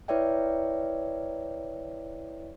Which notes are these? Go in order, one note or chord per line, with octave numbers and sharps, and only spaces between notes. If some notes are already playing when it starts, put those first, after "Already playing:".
E4 B4 C#5 D5 E5 G5